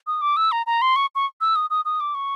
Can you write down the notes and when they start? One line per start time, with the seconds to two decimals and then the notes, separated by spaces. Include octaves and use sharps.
0.07 D#6
0.21 D6
0.37 E6
0.52 A#5
0.67 A#5
0.82 C6
0.96 C#6
1.15 C#6
1.41 E6
1.56 D#6
1.70 D#6
1.85 D#6
2.00 D6
2.15 C#6